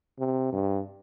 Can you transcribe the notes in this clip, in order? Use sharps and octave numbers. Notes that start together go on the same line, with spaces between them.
C3
G2